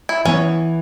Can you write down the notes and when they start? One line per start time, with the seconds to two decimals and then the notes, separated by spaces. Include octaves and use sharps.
0.09 E4
0.25 E3 B3 C#4 E4